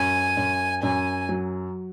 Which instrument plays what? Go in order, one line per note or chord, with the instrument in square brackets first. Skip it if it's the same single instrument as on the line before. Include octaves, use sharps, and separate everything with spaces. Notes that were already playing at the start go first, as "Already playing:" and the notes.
Already playing: [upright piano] F#2 [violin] G#5
[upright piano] F#2
[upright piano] F#2 [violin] G#5
[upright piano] F#3